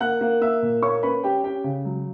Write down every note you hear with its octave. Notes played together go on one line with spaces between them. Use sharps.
A#3 F#5 F#6
A#3
A#3 E5 E6
A#2
A#3 C#5 C#6
C#4 B4 B5
C#4 G4 G5
C#4 G4 G5
C#3
F#3